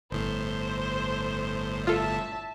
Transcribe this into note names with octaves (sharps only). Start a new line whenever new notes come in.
G1 A2 C5
F4 A4 E5 A5